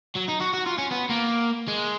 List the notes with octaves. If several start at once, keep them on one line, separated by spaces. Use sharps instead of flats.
F#3
D#4
F#4
F#4
F4
C#4
B3
A#3
G#3